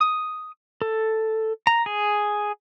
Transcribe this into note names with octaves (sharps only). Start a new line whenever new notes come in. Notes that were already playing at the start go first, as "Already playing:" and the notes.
D#6
A4
A#5
G#4